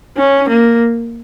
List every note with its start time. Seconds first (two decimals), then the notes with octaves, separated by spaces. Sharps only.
0.17 C#4
0.49 A#3